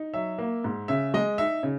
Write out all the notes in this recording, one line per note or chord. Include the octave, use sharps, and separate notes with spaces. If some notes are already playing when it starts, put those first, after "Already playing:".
Already playing: D#4
F#3 E5
A#3
G#2
C#3 E5
G#3 D#5
D#4 E5
C#3